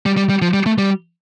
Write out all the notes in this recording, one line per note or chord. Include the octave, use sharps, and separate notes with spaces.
G3
G3
G3
F3
G3
A3
G3